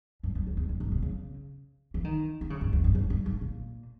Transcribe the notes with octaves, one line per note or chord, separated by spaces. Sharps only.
G2
G2
E2
E2
G2
G#2
B2
C#3
E3
D#3
D#3
C#3
G2
E2
G2
G#2
G2
G#2
A#2